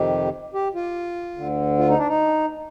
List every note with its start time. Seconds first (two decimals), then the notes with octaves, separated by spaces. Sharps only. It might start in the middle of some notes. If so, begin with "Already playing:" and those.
Already playing: F2 C3 D#3 G4
0.54 G4
0.75 F4
1.37 D2 D3
1.78 F4
1.88 D#4
1.98 D4
2.08 D#4